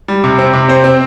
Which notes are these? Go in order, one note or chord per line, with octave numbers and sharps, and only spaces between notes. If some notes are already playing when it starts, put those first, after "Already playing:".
G3
C3
C4
C3
C4 C5
C4